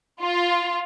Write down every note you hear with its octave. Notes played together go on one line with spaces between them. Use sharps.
F4